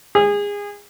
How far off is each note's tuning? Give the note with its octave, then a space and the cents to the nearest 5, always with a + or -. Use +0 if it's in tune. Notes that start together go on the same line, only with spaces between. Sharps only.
G#4 -25